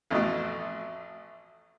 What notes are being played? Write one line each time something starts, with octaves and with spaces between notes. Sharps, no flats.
A1 F2 B2 A3